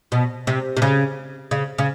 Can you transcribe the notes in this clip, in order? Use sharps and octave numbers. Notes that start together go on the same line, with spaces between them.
B2
C3
C3
C#3
C#3
C#3